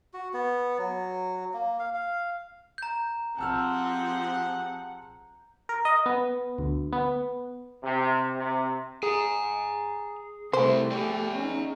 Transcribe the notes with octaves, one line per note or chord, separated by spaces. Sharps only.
F#4
B3
F#3
A#3
F5
F5
A#5 G6
F3 C4 G4 G#4 F#5 A5 E6 F6
A#4
D#5
B3
D2
B3
C3
C3
G#4 G#5 A#5
C3 A3 E4 G4 C5
G#4 D5
C#4 D#4